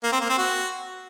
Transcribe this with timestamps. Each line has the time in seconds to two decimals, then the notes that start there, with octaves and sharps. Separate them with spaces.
0.04 A#3
0.12 C4
0.21 A#3
0.29 C4
0.38 F#4